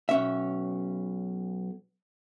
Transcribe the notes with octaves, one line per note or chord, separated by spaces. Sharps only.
B1 C#4 E5